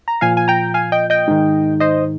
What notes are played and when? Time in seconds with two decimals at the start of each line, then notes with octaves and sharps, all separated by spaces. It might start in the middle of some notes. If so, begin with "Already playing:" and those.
0.08 A#5
0.21 A#2 F3 F5 G#5
0.37 G#5
0.48 G5 A#5
0.74 F5 G#5
0.92 D#5 G5
1.10 D#5 G5
1.28 G#2 D#3
1.80 C5 D#5